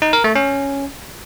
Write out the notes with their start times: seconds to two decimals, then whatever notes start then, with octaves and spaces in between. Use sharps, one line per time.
0.02 D#4
0.13 A#4
0.24 A3
0.35 C#4